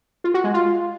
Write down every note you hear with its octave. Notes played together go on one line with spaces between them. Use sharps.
F4
F#4
G#3
F4